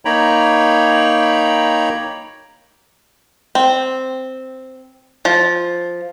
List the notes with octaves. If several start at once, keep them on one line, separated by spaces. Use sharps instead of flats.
A#3 D#4 C#5 G5 A#5 B5
C4
F3